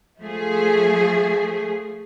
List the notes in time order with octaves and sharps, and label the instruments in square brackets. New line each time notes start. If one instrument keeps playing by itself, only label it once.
[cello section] F3 A3 G#4